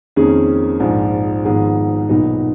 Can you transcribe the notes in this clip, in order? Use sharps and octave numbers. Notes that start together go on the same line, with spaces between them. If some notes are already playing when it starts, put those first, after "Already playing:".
F2 D#3 A#3 C#4 G#4
A#1 G#2 F3
G#1 G#2 F3 B3 G#4
B1 A#2 F#3 B3 D#4